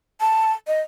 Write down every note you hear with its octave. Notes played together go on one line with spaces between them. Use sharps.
A5
D#5